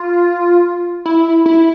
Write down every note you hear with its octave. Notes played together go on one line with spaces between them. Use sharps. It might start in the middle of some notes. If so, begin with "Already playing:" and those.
Already playing: F4
E4
E4